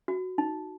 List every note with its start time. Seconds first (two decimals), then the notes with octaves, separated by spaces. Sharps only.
0.08 F#4
0.38 D#4